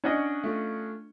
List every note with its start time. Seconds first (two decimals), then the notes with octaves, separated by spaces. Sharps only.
0.04 C#4 D4 D5 D#5 F#5 C#6
0.44 A3 F4